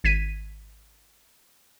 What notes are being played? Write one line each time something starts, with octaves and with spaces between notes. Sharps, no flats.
G#1 G#6 B6 D#7